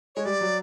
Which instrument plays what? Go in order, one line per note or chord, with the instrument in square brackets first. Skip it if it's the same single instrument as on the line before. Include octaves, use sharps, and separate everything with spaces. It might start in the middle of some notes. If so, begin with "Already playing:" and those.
[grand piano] G#3 [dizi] C#5
[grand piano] G3 [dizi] D5
[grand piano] F#3